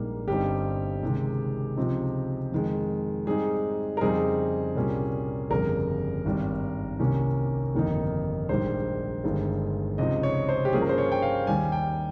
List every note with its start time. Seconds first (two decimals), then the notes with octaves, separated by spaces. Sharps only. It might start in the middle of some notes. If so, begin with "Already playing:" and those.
Already playing: A#1 G#2 G3 A#3
0.28 G1 G2 G3 C4 D#4 G4
1.03 C#2 C3 D#3 G#3
1.77 C#2 C3 F3 C4 D#4
2.52 F2 D#3 G#3
3.26 G#2 G3 C4 D#4 G#4
3.97 A#4
4.01 F2 C#3 G3 C4 D#4 G#4
4.76 C2 A#2 G3 A#3 C#4
5.50 G1 F2 C#3 G3 A#4
6.25 G#1 G2 D#3 G3
6.99 C2 C3 D#3 A#3 C#4
7.75 G1 F2 D#3 A#3 D#4
8.49 A#1 G#2 D#3 G3 C5
9.24 G1 G2 D#3 G#3
9.98 C#2 C3 F3 C4 D#4 D#5
10.23 C#5
10.49 C5
10.65 G4
10.73 G2 F3 A#3 C#4 G#4
10.81 A#4
10.89 C5
10.98 C#5
11.12 G5
11.22 F5
11.47 D#2 D#3 G3 G#5
11.72 G5